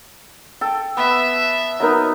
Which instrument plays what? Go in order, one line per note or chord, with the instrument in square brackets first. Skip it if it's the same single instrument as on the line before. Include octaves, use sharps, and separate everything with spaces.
[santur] A4 [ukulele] G5
[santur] B3 [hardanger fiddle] E5
[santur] F#3 B3 D#4 [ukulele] A#4 D#5